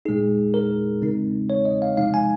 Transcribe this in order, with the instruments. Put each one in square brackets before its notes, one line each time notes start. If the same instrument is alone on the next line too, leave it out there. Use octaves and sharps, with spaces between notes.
[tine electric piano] A#2 G#3 D#4 G#4
A#4
C#3 G#3 C4 D#4
C#5
D#5
F5
C3 F3 G#3 D#4 F5
G#5